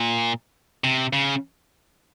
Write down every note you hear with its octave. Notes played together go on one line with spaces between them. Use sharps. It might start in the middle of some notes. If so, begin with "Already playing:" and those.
Already playing: A#2
C3
C#3